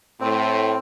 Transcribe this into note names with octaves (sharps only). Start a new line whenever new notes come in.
A2 C4